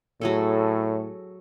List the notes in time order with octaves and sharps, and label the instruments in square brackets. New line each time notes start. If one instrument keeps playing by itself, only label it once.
[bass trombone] A2 [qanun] F#3 G#4 A4